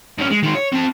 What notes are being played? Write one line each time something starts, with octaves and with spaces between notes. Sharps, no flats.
G2 C#4
G#3
D#3 G#3
C#5
C4 A5